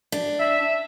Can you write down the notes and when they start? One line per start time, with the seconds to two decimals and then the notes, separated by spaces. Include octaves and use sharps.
0.12 D4
0.39 E5